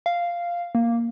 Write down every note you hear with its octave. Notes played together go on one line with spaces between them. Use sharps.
F5
A#3